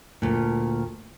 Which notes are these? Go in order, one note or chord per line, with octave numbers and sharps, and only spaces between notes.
D2 A#2